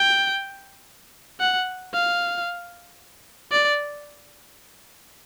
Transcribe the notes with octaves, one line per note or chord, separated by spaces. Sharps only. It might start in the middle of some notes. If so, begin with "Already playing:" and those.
Already playing: G5
F#5
F5
D5